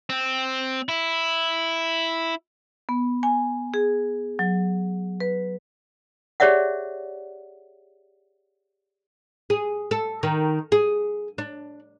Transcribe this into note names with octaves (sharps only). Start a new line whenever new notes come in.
C4
E4
B3
G#5
G#4
F#3
B4
G4 G#4 C#5 D5 E5 F#5
G#4
A4
D#3
G#4
D4